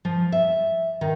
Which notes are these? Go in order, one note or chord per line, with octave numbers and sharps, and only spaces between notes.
F3
E5
D#3